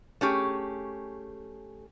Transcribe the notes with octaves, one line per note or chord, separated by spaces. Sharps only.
A3 C#4 G4 G#4